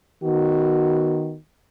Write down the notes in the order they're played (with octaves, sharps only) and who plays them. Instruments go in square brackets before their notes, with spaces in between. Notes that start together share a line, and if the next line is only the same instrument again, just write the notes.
[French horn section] D#3 B3 F#4